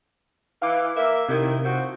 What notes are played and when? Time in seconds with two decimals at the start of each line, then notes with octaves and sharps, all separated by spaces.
0.62 E3 F5 D6
0.97 A#3 E5
1.29 C3 D#3 E4
1.64 F3 C4 F#4